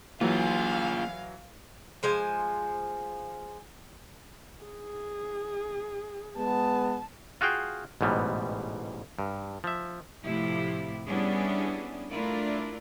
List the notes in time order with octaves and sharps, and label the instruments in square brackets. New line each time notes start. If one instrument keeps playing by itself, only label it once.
[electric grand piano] E3 F#3 [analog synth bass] A#3 [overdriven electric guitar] F4 G#4 [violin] F5
[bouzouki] F3 G#3 G#5
[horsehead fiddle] G#4
[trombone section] G#3 B3 [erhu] A5
[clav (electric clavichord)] F4 F#4 G#4 F5 G5
A1 G#2 B2 G3
G2
F3 E5
[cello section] A2 C3 F3 E4 G4
G3 B3 C#4 D4 E4 G#4
A3 D4 E4 F4 A#4 D5